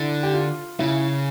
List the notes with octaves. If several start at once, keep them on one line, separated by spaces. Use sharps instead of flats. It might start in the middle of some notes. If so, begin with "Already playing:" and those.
Already playing: D3 E4
G4
F4
C#3 E4